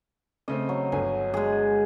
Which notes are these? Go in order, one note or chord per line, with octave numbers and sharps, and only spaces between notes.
C#3 A3 C4 D#5
F#3
G1 D3 G#5
G#3 G#4